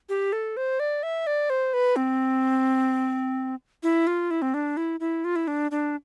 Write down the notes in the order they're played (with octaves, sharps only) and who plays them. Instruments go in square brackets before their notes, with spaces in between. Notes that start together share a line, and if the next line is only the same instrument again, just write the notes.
[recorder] G4
A4
C5
D5
E5
D5
C5
B4
C4
E4
F4
E4
C4
D4
E4
E4
F4
E4
D4
D4